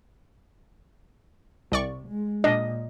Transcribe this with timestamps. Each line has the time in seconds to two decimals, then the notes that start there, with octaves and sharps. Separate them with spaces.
1.72 C2 C3 D5 C#6
2.07 G#3
2.44 A#2 D4 D#5